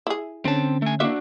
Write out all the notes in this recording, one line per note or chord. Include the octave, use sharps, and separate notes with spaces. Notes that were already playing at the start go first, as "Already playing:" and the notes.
E4 G#4
D3 C4 C#4 A5
A3 G#5
A#3 D4 E4 F#4 E5